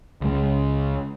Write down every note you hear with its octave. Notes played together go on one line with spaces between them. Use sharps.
C#2 G#3